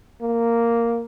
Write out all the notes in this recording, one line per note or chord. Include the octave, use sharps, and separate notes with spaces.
A#3